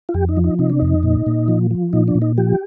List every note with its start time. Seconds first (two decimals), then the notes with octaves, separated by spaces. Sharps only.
0.09 F4
0.14 F2 G4
0.29 D#4
0.37 F3
0.44 D#4
0.59 C3 D#4
0.70 D4
0.79 F2 D#4
1.03 A#2
1.26 A#2
1.48 F3
1.71 F3
1.93 A#2 D#4
2.08 D4
2.15 A#2
2.22 D#4
2.38 F3 G4